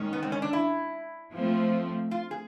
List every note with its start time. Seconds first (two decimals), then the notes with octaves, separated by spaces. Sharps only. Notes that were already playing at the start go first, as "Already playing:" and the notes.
Already playing: D#3 G#3 C#4
0.13 B3
0.23 C4
0.32 C#4
0.42 D4
0.53 E4
1.32 F3 A3 C4
2.11 F4
2.31 G#4